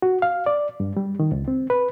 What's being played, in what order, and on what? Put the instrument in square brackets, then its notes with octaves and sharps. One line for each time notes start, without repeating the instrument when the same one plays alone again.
[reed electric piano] F#4
F5
D5
G2
G3
D#3
C#2
C4
B4